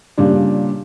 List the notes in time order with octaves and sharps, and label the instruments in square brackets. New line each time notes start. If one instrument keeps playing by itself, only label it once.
[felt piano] A#2 C#3 G3 D4